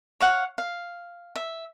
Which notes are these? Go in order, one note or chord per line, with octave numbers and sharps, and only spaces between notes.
C#5 F5 F#5
F5
E5